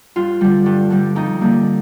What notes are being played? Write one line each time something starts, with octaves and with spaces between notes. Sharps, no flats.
G2 F4
D3 G3
G2
D3 G3
F2 D#4
D3 G3 A#3